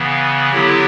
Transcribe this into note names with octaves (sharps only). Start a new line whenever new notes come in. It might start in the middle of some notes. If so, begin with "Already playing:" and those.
Already playing: C#3 E3 B3
D3 F#3 B3 E4 G4